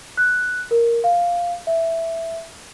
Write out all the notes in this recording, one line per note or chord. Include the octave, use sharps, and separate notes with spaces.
F#6
A#4
F5
E5